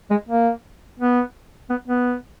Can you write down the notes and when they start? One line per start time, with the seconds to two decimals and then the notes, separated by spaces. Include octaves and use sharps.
0.10 G#3
0.29 A#3
0.99 B3
1.70 B3
1.88 B3